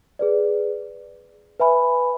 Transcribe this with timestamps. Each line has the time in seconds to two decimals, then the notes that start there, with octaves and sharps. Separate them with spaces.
0.19 G#4 B4 D5
1.59 B4 E5 G#5 B5